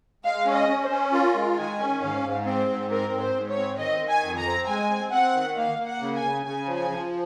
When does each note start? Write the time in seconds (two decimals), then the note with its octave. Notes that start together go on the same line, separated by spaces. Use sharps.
0.24 G#3 F5
0.46 C#4
0.53 D#5
0.69 C#4
0.84 C5
0.90 C#4
1.12 F4 A#4
1.35 G#3
1.57 D#3 G#5
1.79 C#4
2.01 G#2 F5
2.24 G#2
2.46 C4 C5
2.68 G#2
2.90 C4 A#4
3.13 G#2
3.20 C5
3.35 G#2
3.49 C#5
3.57 C4
3.79 D#3 D#5
4.01 D#3
4.09 G#5
4.23 F2
4.38 A#5
4.46 C4
4.68 G#3 G#5
4.90 C4
5.12 C4 F#5
5.35 D#3
5.56 A#3 F5
5.79 A#3
5.86 F#5
6.00 C#3
6.16 G#5
6.24 C#3
6.45 C#3 G#5
6.67 F3
6.75 G#5
6.90 F3